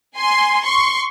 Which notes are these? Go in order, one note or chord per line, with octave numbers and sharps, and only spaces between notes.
G#5 C6
C6 C#6